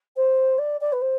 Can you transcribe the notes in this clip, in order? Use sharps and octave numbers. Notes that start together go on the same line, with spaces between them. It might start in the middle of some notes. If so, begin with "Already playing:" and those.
C5
D5
D5
B4
C5